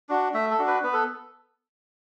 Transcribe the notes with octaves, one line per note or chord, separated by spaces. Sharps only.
D4 F#4
A3 E5
A4
D4 F#4
B4
B3 B4
A4